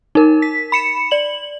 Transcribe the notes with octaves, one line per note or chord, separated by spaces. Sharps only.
D#4 A#4
B6
B5 C#7 E7
D5 F#7